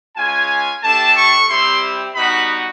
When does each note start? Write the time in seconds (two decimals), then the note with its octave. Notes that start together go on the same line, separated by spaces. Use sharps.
0.17 G#3 C#4 F4 G#5
0.83 A3 D4 G4 A5
1.16 C#6
1.49 G3 C4 E4 G4 C6
2.15 G3 B3 D#4 F#4 B5